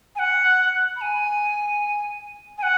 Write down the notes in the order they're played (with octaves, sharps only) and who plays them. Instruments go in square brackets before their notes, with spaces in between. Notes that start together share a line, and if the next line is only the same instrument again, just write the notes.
[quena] G#5
F#5
B5
G#5
G#5
F#5